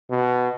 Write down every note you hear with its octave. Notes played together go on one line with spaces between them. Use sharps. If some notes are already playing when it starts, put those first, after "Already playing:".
B2